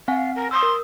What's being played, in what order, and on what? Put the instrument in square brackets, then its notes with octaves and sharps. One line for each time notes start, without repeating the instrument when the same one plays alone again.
[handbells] C4 F#5 G#5 [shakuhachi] F5
[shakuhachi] A#4
[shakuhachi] C6 [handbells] D#6 E6
[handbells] A#4